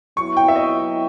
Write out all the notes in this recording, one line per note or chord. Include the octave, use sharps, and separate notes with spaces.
F#3 B3 E4 C#6
G5
E5
D#5